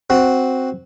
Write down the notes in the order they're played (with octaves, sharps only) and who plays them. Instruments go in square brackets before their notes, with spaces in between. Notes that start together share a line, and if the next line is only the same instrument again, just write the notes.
[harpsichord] C4 F#4